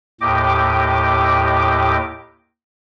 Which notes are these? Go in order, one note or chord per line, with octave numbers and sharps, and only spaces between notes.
D#2 A2 G4 D#5 D6